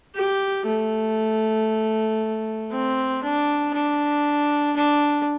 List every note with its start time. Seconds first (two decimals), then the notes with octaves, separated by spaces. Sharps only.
0.15 G4
0.66 A3
2.72 C4
3.23 D4
3.74 D4
4.76 D4